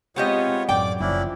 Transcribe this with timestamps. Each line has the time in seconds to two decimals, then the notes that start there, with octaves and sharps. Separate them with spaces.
0.16 G#3 B3 C4 F4 G4 C#5 D#5
0.69 A1 F#2 D5 G5 D6
1.00 F#1 F3 C#4 D4 E4